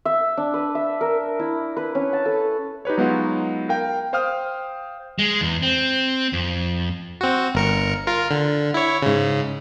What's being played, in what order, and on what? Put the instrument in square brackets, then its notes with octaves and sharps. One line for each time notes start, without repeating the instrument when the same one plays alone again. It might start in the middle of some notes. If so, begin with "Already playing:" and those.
[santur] E5
D4
B4
E5
A#4
E4
B4
C#4
A5
A4
[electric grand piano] D#4 G4 B4 C#5
F#3 G#3 B3 D#4 F4 F#4
A#4 F5 G5
C5 F5 G5 D#6 F6
[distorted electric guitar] G#3
E2
C4
F2
[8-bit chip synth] C4 F#4
G1 A#4 C#7
F4 A#4
D3
E4 C#5
G#2 C#3